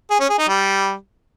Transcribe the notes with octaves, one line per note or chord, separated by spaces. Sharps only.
G#4
C#4
G#4
D#4
G3